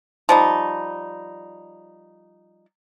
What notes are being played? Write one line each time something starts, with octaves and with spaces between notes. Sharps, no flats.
F3 G3 D#4